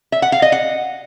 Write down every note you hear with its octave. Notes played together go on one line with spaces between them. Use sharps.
E5
F#5
F5
D#5
F#5